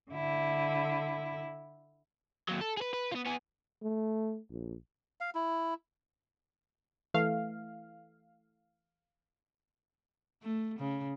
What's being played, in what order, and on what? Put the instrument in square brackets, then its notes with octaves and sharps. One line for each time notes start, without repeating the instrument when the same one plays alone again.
[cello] D3 E4
[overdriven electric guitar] D#2 F#3
A4
G#4 B4
B4
B3 F4
B3 G#4
[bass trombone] A3
A#1
[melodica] F5
E4
[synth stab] E3 A3 F5
[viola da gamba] A3
C#3